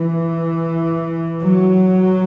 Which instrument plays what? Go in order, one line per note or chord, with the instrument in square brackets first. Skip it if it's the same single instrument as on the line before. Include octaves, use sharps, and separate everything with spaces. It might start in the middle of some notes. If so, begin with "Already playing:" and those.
Already playing: [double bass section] E3
F#3